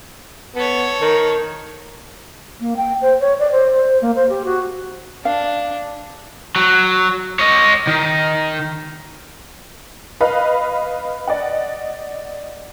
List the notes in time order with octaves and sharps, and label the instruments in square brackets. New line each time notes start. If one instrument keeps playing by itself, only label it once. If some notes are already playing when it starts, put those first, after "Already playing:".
[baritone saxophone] B3 [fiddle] A4 C#5
[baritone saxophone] D#3
[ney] A#3
G5
C5
C#5
D5
C5
C5
A#3
C5
G4
F#4
[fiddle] D4 [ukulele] F5
[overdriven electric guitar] F#3
C#5 D#5
D#3
[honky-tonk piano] B4 D#5 F5 B5
D5 D#5 F#5